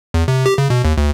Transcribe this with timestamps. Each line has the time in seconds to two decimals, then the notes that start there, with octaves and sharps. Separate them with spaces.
0.14 E2
0.28 C3
0.46 G4
0.58 C#3
0.70 B2
0.85 D#2
0.98 D2